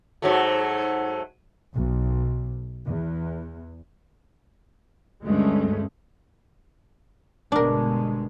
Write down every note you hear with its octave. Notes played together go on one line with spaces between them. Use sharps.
G#2 F#3 A3
B1
E2
D2 G2 G#3 A3 C#4
G1 B2 G#3 D4 A#4